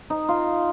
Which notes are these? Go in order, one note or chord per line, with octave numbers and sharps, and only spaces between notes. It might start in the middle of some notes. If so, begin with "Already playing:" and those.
D#4
F4